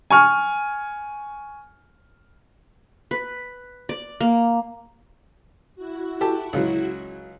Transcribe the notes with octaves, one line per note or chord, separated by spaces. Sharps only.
G#5 C#6 F6
B4
D5
A#3
E4 F#4
G4 A4 A5
C#2 C#3 F#3